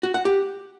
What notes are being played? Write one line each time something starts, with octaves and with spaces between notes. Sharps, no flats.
F#4
F#5
G4